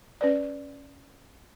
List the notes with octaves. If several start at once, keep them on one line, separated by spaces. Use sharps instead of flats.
C#4 B4 D5